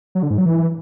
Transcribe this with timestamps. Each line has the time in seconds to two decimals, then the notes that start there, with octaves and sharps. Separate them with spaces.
0.15 F#3
0.23 D3
0.30 G#2
0.38 F#3
0.46 E3